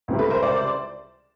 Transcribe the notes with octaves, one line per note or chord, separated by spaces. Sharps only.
C#2 C3 E3 G3
A4 B4
A#4 C5
C5 D5